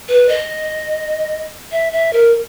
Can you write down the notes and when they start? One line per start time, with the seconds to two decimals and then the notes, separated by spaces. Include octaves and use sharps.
0.09 B4
0.29 D#5
1.72 E5
1.93 E5
2.13 A#4